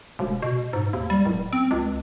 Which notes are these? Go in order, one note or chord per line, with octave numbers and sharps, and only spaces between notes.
E1
B2
G#2
D#2
G3
D1
C4
C#2